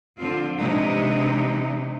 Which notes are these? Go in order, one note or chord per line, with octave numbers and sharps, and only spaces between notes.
D3 F3 C4 F4
C3 E3 G#3 D4 D#4